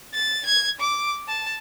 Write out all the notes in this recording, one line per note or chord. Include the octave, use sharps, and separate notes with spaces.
A6
G#6
D6
A5